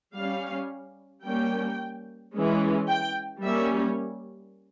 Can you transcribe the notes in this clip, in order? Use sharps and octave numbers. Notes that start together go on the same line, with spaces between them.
G3 C#4 F5
G3 A#3 C#4 G5
E3 G#3 C#4
G5
G3 A#3 C#4 E5